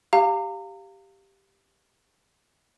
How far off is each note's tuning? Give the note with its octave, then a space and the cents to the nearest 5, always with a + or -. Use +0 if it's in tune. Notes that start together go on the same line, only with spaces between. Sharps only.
G4 +0 F5 +0 A#5 -35